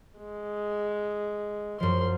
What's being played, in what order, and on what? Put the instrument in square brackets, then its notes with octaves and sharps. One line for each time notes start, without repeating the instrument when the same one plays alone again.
[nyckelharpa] G#3
[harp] F#2 F3 [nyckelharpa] C6